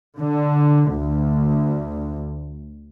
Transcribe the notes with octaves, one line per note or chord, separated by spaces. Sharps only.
D3
D2